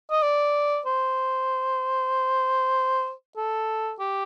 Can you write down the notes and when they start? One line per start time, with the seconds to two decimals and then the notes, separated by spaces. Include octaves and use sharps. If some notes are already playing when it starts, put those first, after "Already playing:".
0.11 D#5
0.23 D5
0.86 C5
3.37 A4
4.00 G4